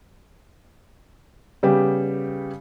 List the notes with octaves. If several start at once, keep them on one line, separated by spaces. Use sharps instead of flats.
C#3 G3 B3 G4